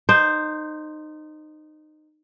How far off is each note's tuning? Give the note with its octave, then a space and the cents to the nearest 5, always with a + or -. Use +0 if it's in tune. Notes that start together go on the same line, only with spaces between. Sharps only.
D#4 -20 C5 +0